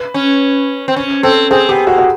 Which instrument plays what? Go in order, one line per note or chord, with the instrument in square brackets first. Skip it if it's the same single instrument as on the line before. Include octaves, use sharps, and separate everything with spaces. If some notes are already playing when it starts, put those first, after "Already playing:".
Already playing: [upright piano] B4
[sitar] C#4
C4
C#4
[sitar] C4 [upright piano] A4
[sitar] C4 [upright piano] G#4
[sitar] B3 [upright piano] G4
[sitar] A#3 [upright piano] F#4
[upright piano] F#4